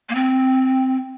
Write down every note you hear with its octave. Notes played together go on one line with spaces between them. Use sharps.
A#3
C4